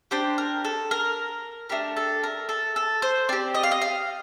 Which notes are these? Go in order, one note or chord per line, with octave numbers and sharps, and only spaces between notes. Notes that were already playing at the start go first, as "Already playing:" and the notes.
D4 G4 C5
A#4
A4
A#4
A3 D4 G4 A#4
A4
A#4
A4
A4
C5
C4 G4 D5
D#5
F5
D#5
F5